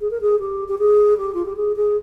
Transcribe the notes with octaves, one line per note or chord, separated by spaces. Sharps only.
G#4
A#4
G#4
G4
G4
G#4
G4
F4
G4
G#4
G#4